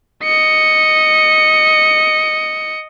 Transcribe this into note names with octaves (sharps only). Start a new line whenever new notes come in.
D#5 C#7